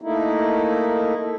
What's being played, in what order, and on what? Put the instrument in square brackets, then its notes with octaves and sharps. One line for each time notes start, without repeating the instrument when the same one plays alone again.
[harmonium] A3 A#3 D#4 E4